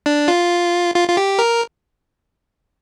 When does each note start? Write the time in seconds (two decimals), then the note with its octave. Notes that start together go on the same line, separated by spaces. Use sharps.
0.06 D4
0.28 F4
0.95 F4
1.08 F4
1.17 G4
1.39 A#4